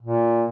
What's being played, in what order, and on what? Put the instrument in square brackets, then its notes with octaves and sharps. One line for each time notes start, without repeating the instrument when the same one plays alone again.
[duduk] A#2